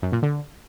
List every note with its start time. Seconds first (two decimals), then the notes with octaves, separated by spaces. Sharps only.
0.02 F#2
0.12 A#2
0.22 D3